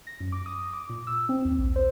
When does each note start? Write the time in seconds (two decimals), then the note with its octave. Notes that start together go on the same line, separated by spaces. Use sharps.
0.07 A#6
0.20 F#2
0.32 D6
0.46 D#6
0.73 D6
0.89 A#2
1.07 E6
1.29 C4
1.45 D#2
1.59 A#1
1.76 C5